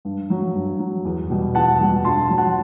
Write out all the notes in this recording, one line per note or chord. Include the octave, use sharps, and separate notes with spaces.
G2
F#3
G2
F#3
E2
B2 G3
E2 F#5 A5
B2 G3
G2 A5 C6
F#3
F#5 A5